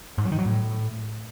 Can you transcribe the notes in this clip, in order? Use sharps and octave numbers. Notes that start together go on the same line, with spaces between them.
G#2
F#3
D#3
F#3
A2